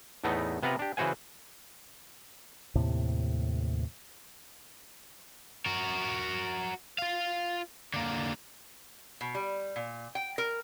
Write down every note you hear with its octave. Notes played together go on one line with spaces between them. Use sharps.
E2 A2 A3 B3 D#4
C3 B3 F4 B4 F#5 A#5
D4 G4
C#3 E3 F#4 C5 F#5 G#5
D#2 A2 C3
F#4 A#4
F4 F5
D3 A#3
B2
G3
A#2
G5
A#4